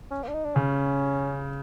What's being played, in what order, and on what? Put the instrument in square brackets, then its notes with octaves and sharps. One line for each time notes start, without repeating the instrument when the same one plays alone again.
[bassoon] C#4
A#3
D4
D#4
D4
[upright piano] C#3 [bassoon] C#4